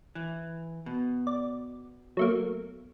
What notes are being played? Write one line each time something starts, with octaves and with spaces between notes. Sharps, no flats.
E3
B2
D5
F#3 A3 A#3